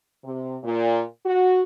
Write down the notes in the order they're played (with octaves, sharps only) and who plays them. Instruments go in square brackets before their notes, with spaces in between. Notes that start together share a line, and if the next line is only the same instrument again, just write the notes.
[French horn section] C3
A#2
F#4